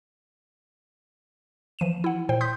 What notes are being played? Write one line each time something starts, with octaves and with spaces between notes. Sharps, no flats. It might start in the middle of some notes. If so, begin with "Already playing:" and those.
E3 F3 D#7 E7
E4 F#5
A#2 C5 G5
C6 D#6 G6 B6